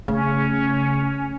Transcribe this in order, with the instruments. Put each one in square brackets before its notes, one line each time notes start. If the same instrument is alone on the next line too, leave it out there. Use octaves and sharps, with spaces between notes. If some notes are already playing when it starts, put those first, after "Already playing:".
[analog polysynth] C#3 [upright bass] A3 [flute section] C#4